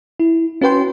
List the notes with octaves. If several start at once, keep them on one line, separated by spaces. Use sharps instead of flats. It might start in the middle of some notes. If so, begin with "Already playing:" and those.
E4
C#4 F#4 B4 G5 C6